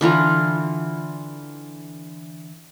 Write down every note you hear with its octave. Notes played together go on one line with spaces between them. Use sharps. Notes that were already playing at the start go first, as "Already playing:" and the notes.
D3 E3 F4 A#5